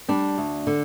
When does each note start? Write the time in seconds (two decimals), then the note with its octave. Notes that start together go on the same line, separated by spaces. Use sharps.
0.08 G3 D4
0.38 D2
0.67 D3